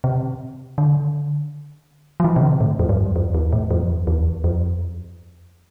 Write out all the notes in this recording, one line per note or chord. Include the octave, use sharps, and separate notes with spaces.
C3
D3
F3
E3
C3
D3
A2
F2
G2
F2
F2
E2
A2
F2
E2
F2
E2
F2